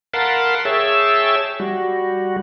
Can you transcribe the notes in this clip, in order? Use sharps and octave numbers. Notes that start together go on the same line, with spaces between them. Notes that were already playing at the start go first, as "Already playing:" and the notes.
A#4 F5 F#5 A5 B5 C6
G#4 C#5 E5 G5 A5 E6
G3 F#4